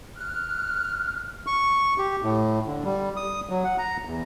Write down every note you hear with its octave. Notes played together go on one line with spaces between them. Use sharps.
F6 F#6
C#6
G4
A2
D3
G3
D#6
F#3
F#5
A#5
E2